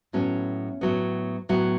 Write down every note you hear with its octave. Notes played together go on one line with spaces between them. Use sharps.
A2 F#3 B3 C#4
A2 F#3 B3
A2 F#3 B3